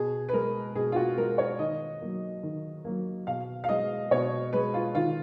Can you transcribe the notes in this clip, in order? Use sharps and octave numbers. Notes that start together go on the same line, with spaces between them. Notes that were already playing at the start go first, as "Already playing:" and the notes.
Already playing: B2 G#4
B4
G#3 A#4
B2 G#4
F4
F#4
G#3 A#4
C#5
D#3 D#5
F#3 A#3
D#3
F#3 A#3
B2 F5
F5
G#3 D#5
B2 C#5
G#3 B4
F4
D#3 F4